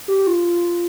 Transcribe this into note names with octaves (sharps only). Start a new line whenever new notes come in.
G4
F4